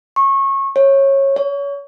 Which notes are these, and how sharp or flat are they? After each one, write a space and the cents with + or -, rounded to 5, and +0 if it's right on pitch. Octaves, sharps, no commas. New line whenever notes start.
C#6 -25
C#5 -20
C#5 +30